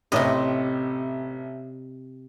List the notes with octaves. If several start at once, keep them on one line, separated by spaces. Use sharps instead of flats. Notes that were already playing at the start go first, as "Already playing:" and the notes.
A1 A2 C3 D#5